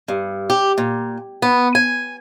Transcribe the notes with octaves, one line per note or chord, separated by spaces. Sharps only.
G2
G4
A#2
B3
G#5